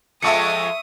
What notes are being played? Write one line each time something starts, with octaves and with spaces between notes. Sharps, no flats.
F2 F3 G#3 E5 C#6 D#6 C#7